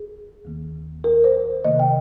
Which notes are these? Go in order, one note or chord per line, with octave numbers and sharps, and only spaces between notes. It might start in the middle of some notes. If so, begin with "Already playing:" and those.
Already playing: G#4
D#2 D#3 A#3
A#4
C5
C3 D#3 A#3 D#5
G5